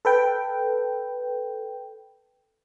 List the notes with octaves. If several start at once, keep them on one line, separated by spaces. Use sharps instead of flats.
A4 B4 G5